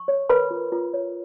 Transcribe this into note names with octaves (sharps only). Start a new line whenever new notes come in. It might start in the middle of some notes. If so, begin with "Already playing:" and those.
Already playing: C#6
C#5
A#4 B4 B5
F4
F4
C#5